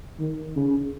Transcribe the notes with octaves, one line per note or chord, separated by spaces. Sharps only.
D#3
C#3